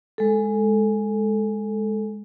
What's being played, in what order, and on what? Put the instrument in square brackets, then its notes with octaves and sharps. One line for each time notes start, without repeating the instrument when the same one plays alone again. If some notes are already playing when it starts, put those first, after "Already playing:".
[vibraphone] G#3 A4